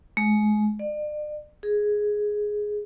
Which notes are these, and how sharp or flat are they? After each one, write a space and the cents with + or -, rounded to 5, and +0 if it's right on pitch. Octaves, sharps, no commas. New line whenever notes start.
G#3 +30
D5 +40
G#4 +5